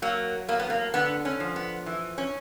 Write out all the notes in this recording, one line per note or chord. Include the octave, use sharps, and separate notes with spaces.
F#3 A#3
A2 A#3
B3
A#3
D3 B3
C#4
F3
B3
E3
C#4